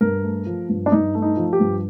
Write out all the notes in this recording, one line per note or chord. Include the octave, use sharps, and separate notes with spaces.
G2 A#4
A3
F3
G2
D4
G2 D#4
A3
D#4
F3
G4
G2